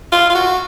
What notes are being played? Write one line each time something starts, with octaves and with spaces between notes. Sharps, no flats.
F4
F4
F#4